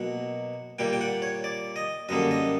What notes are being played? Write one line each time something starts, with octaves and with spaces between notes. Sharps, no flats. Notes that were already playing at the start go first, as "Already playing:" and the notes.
Already playing: B2 F#3 A#3 F#5
A#2 G3 A#3 G5
G5
F#5
C#5
D5
D#5
F#2 D3 G3 A#3 D#5
D#5